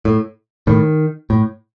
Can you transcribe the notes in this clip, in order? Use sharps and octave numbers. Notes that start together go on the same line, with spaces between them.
A2
A2 D#3
A2